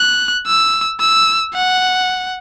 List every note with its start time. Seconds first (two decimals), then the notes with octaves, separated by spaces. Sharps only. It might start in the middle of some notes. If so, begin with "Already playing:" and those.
Already playing: F#6
0.47 E6
1.00 E6
1.54 F#5